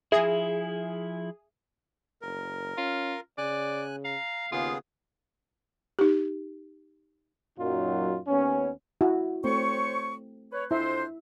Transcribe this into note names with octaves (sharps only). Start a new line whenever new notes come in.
F3 E4 G#4 E5
F#1 A#4
C#4 F4
C#3 D5 G#5 F#6
F5 A#5
D#2 C#3 B3 F4 G#4
D#4 G4
F#2 A#2 F#3 D#4 F4
D#2 B3 C#4
E4 F#4
A3 C4 C5 C#5 C#6
B4 C#5
F2 D4 E4 C5 E5